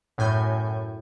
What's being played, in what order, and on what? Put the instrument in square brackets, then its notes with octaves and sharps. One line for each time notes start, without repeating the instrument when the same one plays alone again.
[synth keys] F#2 A2 G#5 G6